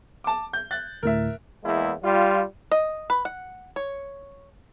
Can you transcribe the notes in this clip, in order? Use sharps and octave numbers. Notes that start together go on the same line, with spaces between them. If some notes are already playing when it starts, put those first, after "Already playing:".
A5 D6
G6
F#6 A6
D2 A2 A#4 E5
E2 G#3 A#3 E4
G3 F4
D#5
B4
F#5
C#5